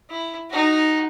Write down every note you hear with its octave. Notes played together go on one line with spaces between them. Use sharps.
E4
D#4 F#4